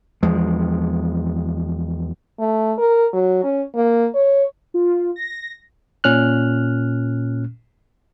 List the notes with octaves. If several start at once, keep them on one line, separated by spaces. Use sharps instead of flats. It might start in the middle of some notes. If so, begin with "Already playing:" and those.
E2 F3 G#3
A3
A#4
F#3
C#4
A#3
C#5
F4
A#6
A#2 C#4 F6 F#6